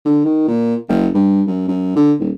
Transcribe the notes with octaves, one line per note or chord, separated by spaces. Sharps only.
D3
D#3
A#2
F#1
G2
F#2
F#2
D3
D#1